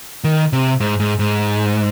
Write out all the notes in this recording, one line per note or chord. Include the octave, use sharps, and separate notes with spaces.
D#3
C3
G#2
G#2
G#2